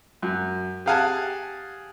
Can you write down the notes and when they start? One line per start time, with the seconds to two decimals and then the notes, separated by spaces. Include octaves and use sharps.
0.22 F#2
0.86 G4 G#4 F5 F#5 G#5 A5